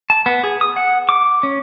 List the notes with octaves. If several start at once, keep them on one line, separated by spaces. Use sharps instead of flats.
A5
B3
G#4
D#6
F#5
D6
C#4